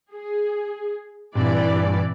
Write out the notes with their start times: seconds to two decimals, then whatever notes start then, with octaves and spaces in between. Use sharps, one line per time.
0.13 G#4
1.35 G2 A#2 E3 C4 D5